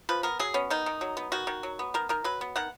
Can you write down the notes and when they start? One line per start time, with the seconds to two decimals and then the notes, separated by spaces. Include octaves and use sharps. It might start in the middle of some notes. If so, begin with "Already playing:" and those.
0.09 F3 B4
0.23 B3 A#4
0.39 F#3 G#4
0.54 B3 C#4
0.70 D#3 D#4
0.86 D#3
1.01 F#3
1.17 B3
1.32 D#3 F#4
1.47 D#3
1.63 F#3
1.79 B3
1.94 D#3 A#4
2.09 D#3 A#4
2.24 F#3 B4
2.41 B3
2.56 D#3 F#5